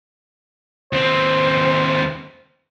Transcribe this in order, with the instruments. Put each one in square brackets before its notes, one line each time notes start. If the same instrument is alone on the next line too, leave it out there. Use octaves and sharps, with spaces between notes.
[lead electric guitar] D#2 C4 [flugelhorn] C5